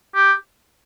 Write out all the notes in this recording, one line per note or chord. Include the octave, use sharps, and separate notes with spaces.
G4